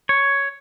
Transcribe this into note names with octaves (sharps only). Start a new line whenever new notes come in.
C#5